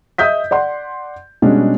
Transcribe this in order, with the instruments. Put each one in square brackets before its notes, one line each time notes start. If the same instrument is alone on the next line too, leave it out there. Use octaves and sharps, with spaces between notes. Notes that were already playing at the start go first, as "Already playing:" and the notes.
[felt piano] D#5 E5 D#6 G6 B6
D5 F#5 C6
B2 G3 G#3 C#4 D4